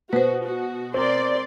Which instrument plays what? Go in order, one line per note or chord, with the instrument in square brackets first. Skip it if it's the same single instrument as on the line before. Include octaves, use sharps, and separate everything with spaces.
[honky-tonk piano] B2 [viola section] F#4 [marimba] B4 C5
[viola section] F#4
[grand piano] C4 A#4 [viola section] D5 C6